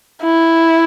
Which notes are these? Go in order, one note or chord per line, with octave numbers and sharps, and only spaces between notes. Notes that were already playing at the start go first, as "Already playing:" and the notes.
E4